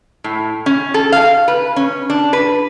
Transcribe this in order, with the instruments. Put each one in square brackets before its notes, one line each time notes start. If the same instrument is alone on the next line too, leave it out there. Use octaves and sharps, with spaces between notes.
[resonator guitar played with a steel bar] A2
C#4
A4
F5
B4
C#4
D4
B4